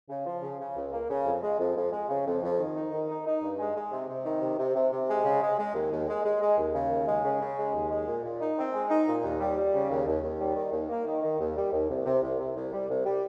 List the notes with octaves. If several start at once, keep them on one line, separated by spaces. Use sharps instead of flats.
C#3
F3
C#3
C#3
C#2
A#3
C#3
F2
G#3
F2
F2
G#3
C#3
F2
F2
D#3
D#4
D#3
D#4
D#4
G2
G#3
G#3
C3
C3
D#3
C3
C3
C3
C3
G#3
C#3
G#3
G#3
D#2
D#2
G#3
G#3
G#3
D#2
C#3
D#2
G#3
C#3
C#3
G#3
D#2
G#3
A#2
A#2
D#4
C4
G#3
D#4
A#2
D#2
G3
G3
C#3
D#2
D#2
D#2
G3
D#3
D#2
A#3
D#3
D#3
D#2
G3
D#2
C2
C3
C2
C3
C2
G3
C2
G3